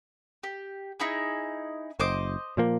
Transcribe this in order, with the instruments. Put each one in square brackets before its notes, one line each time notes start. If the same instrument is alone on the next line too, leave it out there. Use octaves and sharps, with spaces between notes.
[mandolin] G4
D#4 E4 G#4
[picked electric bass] F#1 [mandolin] C5 D#5 D6
[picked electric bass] A#2 F3 A#3